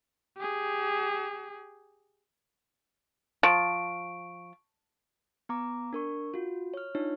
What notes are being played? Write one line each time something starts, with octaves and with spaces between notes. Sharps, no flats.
G4 G#4
F3 C#6 D7
B3 A#5 D6
D4 A#4 C#6
F4 F#4
C#5 F6
D4 D#4 F4 C#5